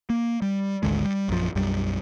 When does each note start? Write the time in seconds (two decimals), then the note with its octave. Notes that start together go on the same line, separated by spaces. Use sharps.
0.10 A#3
0.42 G3
0.83 G#1 D2 D3 G#3
1.05 G3
1.28 A#1 F#2 F3
1.55 B1 F#2 G3